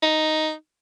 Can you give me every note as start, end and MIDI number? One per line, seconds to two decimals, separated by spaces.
0.02 0.53 63